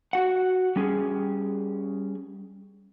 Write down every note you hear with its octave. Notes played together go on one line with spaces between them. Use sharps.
F#4 F#5
G3 C#4 G#4